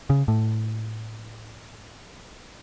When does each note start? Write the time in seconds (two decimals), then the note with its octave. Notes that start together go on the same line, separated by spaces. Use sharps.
0.10 C#3
0.28 A2